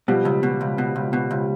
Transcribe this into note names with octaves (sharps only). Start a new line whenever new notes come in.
B2 F3 G3
C#2
B2
C#2
B2
C#2
B2
C#2